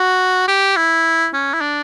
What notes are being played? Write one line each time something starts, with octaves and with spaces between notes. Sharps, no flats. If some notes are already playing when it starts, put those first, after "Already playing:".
Already playing: F#4
G4
E4
C#4
E4
D4